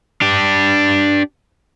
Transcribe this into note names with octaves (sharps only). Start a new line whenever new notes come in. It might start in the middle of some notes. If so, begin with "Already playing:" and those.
D4 G4